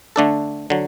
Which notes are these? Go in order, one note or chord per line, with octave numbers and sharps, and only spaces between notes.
D3 A3 D4 A4
D3 F#3